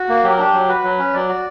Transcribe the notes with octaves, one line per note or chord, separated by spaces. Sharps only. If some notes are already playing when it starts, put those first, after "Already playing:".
Already playing: F#4
A#3
F#3 G4
A#4
D4 G4
F#3
F#4 B4
F#3
C#4
F#3 D5
F#4